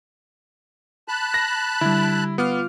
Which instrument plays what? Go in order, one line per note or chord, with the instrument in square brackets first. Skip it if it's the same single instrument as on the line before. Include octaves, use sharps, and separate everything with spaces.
[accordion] A5 B5 F#6
[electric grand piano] A#6
[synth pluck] D3 G3 [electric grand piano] E4
[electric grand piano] B3 [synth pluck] F4 D6 F6